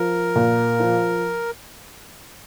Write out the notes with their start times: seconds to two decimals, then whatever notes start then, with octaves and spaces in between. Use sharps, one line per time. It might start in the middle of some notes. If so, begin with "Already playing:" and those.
Already playing: F3 A#4
0.36 A#2
0.80 F3